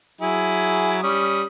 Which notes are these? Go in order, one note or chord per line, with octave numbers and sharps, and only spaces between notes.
F#3 E4 G#4
G3 C#4 D#6